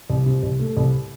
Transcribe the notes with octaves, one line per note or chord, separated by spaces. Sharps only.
C2
C3
C2
A3
C2